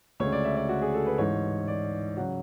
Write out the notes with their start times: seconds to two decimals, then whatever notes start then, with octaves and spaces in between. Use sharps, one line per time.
0.20 D2 C#3 G#3 C#5
0.32 D5
0.44 E5
0.57 D5
0.69 F#4
0.82 G#4
0.94 A4
1.06 B4
1.18 A1 G#2 E3 C#5
1.68 D5
2.17 C#3 F#3 F#5